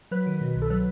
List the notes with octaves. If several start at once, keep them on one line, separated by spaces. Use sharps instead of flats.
F#3 B4
D#3
B2
C2
A4
F#3 B4